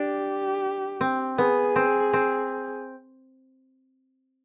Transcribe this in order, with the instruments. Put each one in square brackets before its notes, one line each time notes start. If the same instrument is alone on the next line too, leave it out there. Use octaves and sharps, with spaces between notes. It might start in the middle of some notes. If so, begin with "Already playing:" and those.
Already playing: [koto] D4 [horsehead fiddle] G4
[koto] C4
[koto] B3 [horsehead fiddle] G#4
[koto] C4
C4